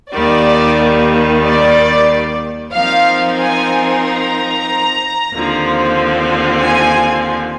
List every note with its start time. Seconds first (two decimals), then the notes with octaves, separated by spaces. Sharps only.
0.12 D#2 D#3 G3 D5
1.42 D5
2.73 F3 C4 D#4 A#4 F5
3.39 G#5
4.03 A#5
5.34 D#2 D3 F3 C4
6.64 G#5